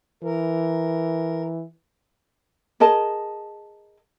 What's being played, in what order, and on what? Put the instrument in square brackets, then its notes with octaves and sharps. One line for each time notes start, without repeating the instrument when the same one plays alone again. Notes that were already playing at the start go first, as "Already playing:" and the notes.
[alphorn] E3 [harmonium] A#4
[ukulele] G#4 A#4 D#5 A5